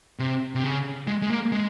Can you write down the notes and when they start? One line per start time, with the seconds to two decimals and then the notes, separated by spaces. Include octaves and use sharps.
0.19 C3
0.55 C3
0.64 C#3
1.07 G#3
1.22 G#3
1.30 A#3
1.52 G#3